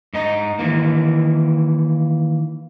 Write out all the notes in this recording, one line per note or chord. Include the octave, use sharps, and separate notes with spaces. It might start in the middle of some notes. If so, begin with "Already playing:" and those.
G#2 D#4 D#5 A#5
D#3 E3 A#3